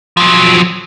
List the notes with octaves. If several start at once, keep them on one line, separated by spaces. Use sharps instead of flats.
F3 F#3